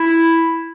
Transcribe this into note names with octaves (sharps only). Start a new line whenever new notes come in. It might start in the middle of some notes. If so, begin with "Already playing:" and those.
Already playing: E4